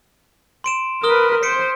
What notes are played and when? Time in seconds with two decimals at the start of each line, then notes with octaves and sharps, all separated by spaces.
0.64 C6 D7 E7
1.03 A#4 B4 D#6 F6 G7
1.43 C5 B6 C#7 D7